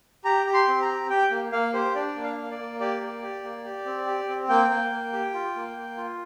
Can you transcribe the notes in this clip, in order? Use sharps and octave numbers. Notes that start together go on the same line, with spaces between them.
G4 A#5
G4
C6
C4
A#5
G4
G4 G5
A#3
A#3 F5
G4 C5
D4 D5
A#3
F5
A#3
D5
A#3
G4 D5
A#3
G4
A#3
G4
C4
G4
C4
A#3 G5
A#3
A#3
G4
F4
A#3
A#3
F4